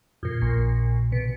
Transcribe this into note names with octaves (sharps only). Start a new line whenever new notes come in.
F2 A#2
A#1 A#2
B2